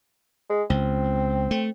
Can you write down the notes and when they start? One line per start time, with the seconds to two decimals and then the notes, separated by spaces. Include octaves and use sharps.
0.50 G#3
0.70 C#2 C4
1.51 A3